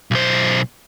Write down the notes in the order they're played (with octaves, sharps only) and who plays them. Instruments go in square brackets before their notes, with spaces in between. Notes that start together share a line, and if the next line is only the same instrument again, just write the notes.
[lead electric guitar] B1 C5